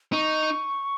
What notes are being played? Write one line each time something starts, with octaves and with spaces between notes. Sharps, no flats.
D#4 C#6